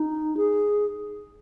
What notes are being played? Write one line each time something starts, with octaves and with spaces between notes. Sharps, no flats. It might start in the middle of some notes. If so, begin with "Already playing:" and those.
Already playing: D#4
G#4